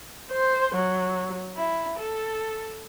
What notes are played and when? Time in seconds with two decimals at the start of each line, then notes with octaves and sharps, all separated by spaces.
0.32 C5
0.75 F#3
1.56 E4
1.97 A4